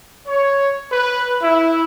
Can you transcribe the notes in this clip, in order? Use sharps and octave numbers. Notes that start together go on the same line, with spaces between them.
C#5
B4
E4